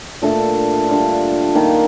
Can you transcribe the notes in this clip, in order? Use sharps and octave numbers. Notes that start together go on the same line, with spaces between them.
A#2 A3 D4 A4
G3 D4 F4
D#3 A#3 D4 F4